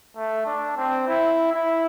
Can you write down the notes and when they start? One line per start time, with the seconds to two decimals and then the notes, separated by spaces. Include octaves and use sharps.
0.16 A3
0.46 D4
0.77 C4
1.07 E4
1.52 E4